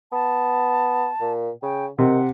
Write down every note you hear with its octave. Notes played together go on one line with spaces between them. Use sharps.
B3 A5
A#2
C#3 G5
C3 D#3 F#5